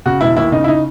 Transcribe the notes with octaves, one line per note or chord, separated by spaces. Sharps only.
C#3 F#4
E1 E4
D#2 E4
C#3 D#4
E4
C#3 D#4